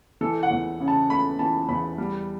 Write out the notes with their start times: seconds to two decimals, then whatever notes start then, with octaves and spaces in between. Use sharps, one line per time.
0.21 E3 A4
0.43 F#5
0.51 E2
0.80 C#3
0.88 A5
1.10 A3 B5
1.39 E3 A5
1.68 E2 B5
1.98 G3